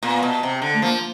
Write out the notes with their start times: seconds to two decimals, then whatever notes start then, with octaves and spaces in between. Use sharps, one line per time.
0.03 A#2 B3
0.23 B2
0.43 C3
0.62 D3
0.74 A3
0.82 F3 A#3